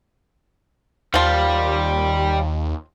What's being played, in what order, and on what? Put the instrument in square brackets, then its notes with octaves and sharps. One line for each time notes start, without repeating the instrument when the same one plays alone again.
[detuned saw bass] D#2 [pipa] F3 F4 [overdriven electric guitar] G3